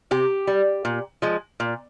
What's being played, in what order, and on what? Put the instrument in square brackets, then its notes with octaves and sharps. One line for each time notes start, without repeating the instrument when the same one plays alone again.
[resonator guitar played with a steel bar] C3 G4
G3
A#2
F3 G#3
A#2